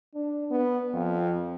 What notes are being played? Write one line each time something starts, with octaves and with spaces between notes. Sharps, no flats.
D4
B3
F2